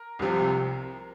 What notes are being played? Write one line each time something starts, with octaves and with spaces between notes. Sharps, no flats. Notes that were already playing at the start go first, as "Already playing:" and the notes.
Already playing: A#4
C2 C3 F3